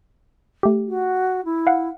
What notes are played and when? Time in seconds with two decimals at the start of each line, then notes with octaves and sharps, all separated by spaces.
0.63 A3 G4
0.87 F#4
1.45 E4
1.67 F5 F#5